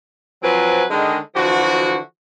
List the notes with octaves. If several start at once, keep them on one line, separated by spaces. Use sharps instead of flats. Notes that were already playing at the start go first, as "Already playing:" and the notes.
F3 F#3 C4 B4 G#5
D3 D#3 G#3
D3 E3 F3 F#4